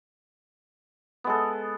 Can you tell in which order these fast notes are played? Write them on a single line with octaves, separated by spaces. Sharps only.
B3 G#3 A4